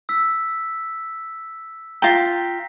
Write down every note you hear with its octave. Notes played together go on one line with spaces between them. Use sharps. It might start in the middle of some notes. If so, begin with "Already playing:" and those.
E6 B6
F4 G5 A#5 A#6 B6